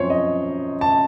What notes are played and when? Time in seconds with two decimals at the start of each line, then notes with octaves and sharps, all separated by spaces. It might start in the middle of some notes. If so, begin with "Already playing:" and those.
Already playing: F#2 F3 C4 C5 C#5
0.10 D#5
0.81 A5